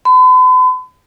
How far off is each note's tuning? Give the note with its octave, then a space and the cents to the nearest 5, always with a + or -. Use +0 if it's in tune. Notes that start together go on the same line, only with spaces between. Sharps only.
B5 +45